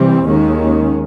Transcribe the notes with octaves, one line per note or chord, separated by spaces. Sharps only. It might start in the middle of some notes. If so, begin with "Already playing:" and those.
Already playing: C3 E3 G3 C4
D#2 D#3 G#3 C#4